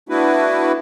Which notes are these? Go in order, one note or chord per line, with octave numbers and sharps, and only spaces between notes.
A3 B3 D4 E4 F#4 B4